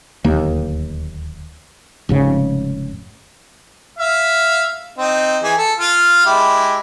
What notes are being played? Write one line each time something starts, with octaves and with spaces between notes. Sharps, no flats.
D1 D#2 A#3
F1 G#2 C#3
E5 F5
C4 D#4
E3 G#4
A4
F4 F5
G#3 E4 G4